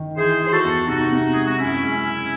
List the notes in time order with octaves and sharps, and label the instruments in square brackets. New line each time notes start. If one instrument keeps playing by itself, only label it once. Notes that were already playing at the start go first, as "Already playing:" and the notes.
Already playing: [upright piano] D#3
[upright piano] E3 [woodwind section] G#4 C5
[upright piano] E3
[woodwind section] C5
F#4 A4
[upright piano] E2
[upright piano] C3 [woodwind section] D#4 F#4
[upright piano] C3
[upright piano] G#3 [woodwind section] G#4
[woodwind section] F#4
[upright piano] F#2 [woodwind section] C#4 E4
[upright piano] G#3
C#3